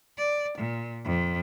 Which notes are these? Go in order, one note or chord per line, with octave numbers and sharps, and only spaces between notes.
D5
A#2
F2